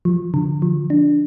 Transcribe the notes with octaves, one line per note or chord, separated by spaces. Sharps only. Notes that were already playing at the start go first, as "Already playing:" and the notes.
F3
D3
F3
D4